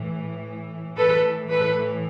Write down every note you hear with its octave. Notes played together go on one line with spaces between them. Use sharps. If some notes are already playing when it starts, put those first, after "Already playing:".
Already playing: A2 E3
A2 E3 A4 B4
A4 B4